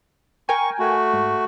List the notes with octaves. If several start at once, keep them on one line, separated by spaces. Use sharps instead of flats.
A#4 G5 G#5 C#6
A3 F#4
G#2